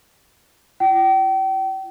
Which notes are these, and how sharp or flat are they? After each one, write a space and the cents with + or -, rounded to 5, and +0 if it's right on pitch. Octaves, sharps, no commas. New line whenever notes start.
F4 -45 G5 -35